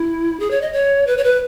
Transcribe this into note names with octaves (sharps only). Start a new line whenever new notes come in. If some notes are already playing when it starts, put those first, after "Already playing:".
Already playing: E4
G#4
C#5
D#5
C#5
B4
C#5
B4